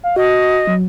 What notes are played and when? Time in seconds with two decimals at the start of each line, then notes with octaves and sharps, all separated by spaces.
0.04 F5
0.16 F#4 D#5
0.67 F#3